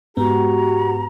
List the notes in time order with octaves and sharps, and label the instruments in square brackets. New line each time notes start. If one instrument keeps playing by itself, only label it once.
[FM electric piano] G#2 B3 [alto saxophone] F#4 [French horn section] G4 [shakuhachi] A#5